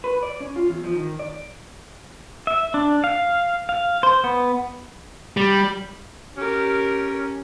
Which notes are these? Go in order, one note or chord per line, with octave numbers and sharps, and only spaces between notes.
B4
D5
C#4
F4
E2
F3
D#3
D5
E5
D4
F5
F5
C5
B3
G3
C#4 G4 A#4